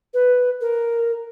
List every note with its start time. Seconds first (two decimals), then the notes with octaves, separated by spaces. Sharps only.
0.14 B4
0.61 A#4